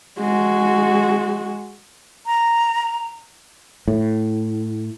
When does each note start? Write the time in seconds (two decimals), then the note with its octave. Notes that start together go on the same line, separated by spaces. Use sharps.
0.19 G#3 F#4
2.26 A#5
3.88 A2